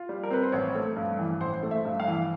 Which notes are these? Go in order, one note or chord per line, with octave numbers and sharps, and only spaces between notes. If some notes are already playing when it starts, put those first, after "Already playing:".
Already playing: F4
G3
A#4
C4 B4
C5
A1 C#5
A3
G2
E3
A1 C5
A3
E5
G2
F5
E3